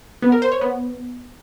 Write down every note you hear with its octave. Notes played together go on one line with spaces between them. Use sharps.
B3
A#4
C5
C#5
B3